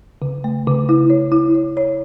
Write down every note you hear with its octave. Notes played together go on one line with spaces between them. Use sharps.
C#3
A3
C#3
E4
C#5
E4
C#5
C#5